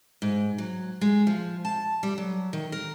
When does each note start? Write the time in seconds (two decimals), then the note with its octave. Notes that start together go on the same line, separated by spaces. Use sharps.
0.22 G#2
0.58 F#3
1.01 G#3
1.27 F3
1.65 A5
2.03 G3
2.18 F#3
2.53 D#3
2.72 A#4